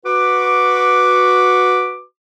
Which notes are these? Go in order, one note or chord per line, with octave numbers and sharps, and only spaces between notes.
F#4 B4 D6